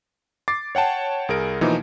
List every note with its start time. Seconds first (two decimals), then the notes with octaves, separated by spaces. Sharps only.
0.48 D6 A6 C7
0.75 C#5 F#5 G5 A5
1.29 C2 G#4 A#4 D7
1.61 B2 E3 F3 A#3 D#4